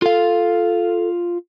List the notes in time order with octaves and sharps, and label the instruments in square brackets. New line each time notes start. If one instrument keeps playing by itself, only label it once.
[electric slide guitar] F4 F5 [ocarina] A4